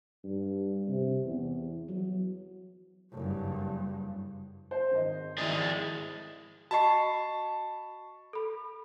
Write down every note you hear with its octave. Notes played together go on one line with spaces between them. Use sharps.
G2
C3
E2
F#3
F#1 G2
C5
G#1 D#5
G#1 E4 G#4 D5 D#5 D#6
F#4 D#5 A5 B5 C#6 C7
A4 B5